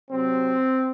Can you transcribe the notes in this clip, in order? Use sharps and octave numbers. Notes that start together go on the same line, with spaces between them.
C3 F#3 C4